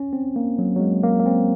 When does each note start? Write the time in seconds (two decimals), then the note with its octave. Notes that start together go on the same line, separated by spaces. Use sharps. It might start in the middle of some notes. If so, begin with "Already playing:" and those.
Already playing: C#4
0.13 C4
0.36 A#3
0.59 F#3
0.76 F#3
0.80 G#3
1.03 A#3
1.19 A#3
1.26 C4